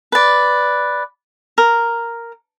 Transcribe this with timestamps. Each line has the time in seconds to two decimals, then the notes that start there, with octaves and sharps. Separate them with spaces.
0.12 B4 D5
1.58 A#4